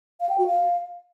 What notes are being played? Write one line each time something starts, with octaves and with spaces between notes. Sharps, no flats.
F5
G5
F#4
F5